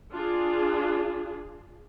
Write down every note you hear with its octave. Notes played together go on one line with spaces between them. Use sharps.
D4 F4 G#4